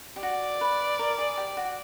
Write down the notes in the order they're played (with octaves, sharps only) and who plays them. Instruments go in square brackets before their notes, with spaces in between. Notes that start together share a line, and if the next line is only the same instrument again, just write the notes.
[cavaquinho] G4
[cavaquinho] F#4 [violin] D5
[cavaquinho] B4
A#4
G#4
G4
F#4